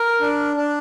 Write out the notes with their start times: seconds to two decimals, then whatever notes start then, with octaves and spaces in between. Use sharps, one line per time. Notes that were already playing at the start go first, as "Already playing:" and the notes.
Already playing: A#4
0.21 D4
0.56 D4